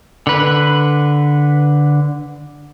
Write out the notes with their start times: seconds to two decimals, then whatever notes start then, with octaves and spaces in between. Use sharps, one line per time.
0.27 D3 B4